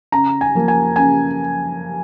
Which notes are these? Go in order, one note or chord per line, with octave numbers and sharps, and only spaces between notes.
C#3 A#5
G#5
F3 A#3
G#5
C#3 G#5